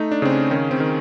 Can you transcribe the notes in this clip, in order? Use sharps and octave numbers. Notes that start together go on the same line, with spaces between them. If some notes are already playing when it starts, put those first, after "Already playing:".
Already playing: A3 D#4
D4
C#3 C4
C#4
D#3 C#4
C4
D#3